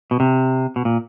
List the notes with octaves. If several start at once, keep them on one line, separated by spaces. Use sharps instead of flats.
B2
C3
B2
A#2